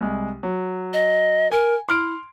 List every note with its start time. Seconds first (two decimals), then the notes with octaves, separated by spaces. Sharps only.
0.01 C2 G#3
0.43 F#3
0.93 D#5
1.52 A#4 G#5
1.89 E4 C6 F6 D7